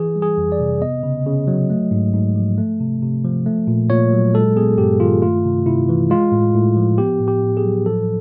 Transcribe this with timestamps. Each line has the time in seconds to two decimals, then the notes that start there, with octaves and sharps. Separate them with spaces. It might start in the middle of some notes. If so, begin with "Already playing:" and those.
Already playing: E3 G#4
0.16 G3
0.22 G#4
0.37 F2
0.52 D5
0.60 C3
0.81 B3 D#5
1.03 C#3
1.26 C#3
1.47 F#3
1.70 A3
1.91 G#2
2.14 G#2
2.36 F3
2.58 A3
2.80 C3
3.02 C3
3.24 F3
3.46 A3
3.67 A#2
3.90 A#2 C#5
4.13 F#3
4.34 G#3 A4
4.56 B3 G#4
4.78 G2 G4
5.00 D#3 F4
5.22 A3 F4
5.44 C3
5.66 C3 E4
5.89 E3
6.10 G#3 F4
6.32 A2
6.54 A2
6.77 F3
6.98 B3 G4
7.20 A2
7.28 G4
7.43 A2
7.57 G#4
7.64 F#3
7.86 F3 A4